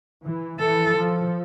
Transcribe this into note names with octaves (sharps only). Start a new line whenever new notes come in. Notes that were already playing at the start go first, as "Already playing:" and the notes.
E3
E3 A4
F3